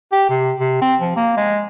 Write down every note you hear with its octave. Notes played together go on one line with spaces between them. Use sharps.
G4
C3
C3
C4
F3
A#3
G#3